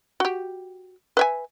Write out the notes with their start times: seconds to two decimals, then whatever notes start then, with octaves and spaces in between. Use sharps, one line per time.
0.20 F#4 G4
1.17 B4 E5 G#5